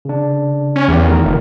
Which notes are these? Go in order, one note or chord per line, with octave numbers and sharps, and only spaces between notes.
C#3 D4
C#4
E2 G4 C#5
D#3 A3 A#4
F1